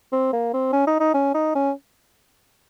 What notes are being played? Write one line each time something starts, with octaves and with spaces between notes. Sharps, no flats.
C4
A#3
C4
C#4
D#4
D#4
C#4
D#4
C#4